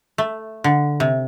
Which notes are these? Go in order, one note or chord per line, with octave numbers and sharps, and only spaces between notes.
A3
D3
C3